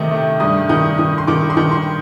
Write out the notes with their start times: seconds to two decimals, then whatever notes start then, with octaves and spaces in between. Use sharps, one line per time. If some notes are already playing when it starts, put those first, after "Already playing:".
Already playing: C3 D#3 A3 D#4
0.11 A3
0.40 G2 D#6
0.69 D#3 D#6
0.98 D#3 D#6
1.18 C6
1.27 D#3 D6
1.50 C6
1.57 D#3
1.72 C6